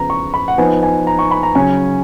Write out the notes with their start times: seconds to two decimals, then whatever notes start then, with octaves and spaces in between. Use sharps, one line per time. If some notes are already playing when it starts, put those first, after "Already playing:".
Already playing: C#3 F3 B3 A#5
0.10 C#6
0.34 B5
0.48 F#5
0.58 F3 B3 D#4 G#5
0.83 G#5
1.07 A#5
1.19 C#6
1.31 B5
1.43 A#5
1.55 C#3 F#3 C#4 G#5